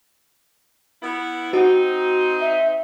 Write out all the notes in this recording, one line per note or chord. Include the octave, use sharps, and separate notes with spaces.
B3 E4
C4 D#4 F#4
E5